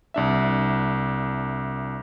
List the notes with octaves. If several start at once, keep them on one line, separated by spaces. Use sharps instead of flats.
C2 D4 E5